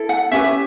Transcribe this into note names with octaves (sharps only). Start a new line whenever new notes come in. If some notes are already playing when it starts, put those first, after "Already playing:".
Already playing: E4 A4
F#5
C#4 G4 B4 E5